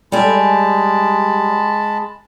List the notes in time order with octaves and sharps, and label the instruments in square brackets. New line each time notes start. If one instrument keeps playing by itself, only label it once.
[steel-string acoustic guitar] G3 G#4 [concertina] G#3 A5 B5